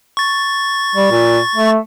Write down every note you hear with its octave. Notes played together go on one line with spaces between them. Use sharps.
C#6 A6
G3
A#2
A3